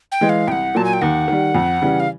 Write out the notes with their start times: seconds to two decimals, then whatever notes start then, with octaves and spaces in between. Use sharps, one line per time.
0.12 G5
0.21 E3 G#3
0.29 F5
0.47 C2 G5
0.52 F#5
0.75 A#2 F#3 A5
0.85 G#5
0.93 G5
1.01 D#2 F#5
1.28 D#3 G3
1.54 F2
1.82 C#3 E3 G3
2.00 F5